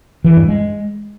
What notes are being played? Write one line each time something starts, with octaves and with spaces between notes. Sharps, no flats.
E3
G2
G#3